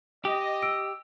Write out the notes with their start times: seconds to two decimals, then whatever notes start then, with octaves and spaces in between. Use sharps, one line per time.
0.25 G4 D#5
0.62 E6 D7